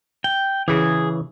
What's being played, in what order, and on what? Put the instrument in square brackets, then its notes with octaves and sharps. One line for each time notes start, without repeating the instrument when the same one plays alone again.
[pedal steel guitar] G5
[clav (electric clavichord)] C#3 E3 [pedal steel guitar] G#4